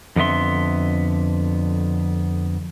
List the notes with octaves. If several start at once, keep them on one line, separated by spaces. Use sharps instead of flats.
F2 D3 B3 E5 C6